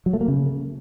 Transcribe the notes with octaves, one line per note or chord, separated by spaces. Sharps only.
F#3
A3
A#3
C#3